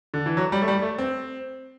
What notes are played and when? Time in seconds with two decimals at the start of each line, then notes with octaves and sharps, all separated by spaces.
0.14 D3
0.26 E3
0.37 F#3
0.52 G3
0.62 A3
0.68 G3
0.82 A3
0.98 C4